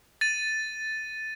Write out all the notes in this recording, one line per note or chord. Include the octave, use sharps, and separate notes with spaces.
A6 D#7